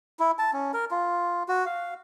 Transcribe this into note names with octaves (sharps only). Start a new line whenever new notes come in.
E4
A5
C#4
A#4
F4
F#4
F5